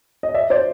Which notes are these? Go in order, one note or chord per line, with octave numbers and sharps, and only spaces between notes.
D#5
D5 E5
C5 D5